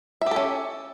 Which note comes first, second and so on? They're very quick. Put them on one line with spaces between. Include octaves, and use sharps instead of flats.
E5 G4 A4 C#4